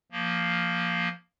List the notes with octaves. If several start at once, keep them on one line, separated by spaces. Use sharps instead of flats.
F3 A#3